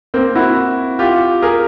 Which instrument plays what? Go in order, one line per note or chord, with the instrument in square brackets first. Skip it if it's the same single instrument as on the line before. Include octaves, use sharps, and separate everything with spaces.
[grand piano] A#3 C4
E4 F#4
F4 G4
G#4 A#4